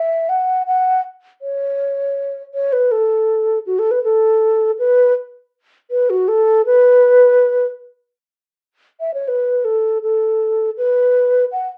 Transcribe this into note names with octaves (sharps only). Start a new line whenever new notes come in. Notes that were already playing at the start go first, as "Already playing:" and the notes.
Already playing: E5
F#5
F#5
C#5
C#5
B4
A4
F#4
A4
B4
A4
B4
B4
F#4
A4
B4
E5
C#5
B4
A4
A4
B4
F#5